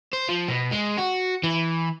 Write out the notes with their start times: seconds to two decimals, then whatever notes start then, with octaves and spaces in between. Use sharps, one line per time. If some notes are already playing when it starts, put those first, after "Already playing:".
0.13 C5
0.29 F3
0.49 B2
0.72 G#3
0.99 F#4
1.43 E3